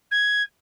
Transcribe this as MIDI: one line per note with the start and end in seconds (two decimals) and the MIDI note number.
0.11 0.42 92